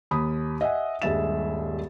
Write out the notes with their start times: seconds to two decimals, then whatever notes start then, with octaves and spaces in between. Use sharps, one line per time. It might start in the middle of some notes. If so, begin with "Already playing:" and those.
0.11 D#2 B5 D#6
0.61 D#5 E5 F#5 G#5
1.02 D#1 G2 G#3 E5 A6 E7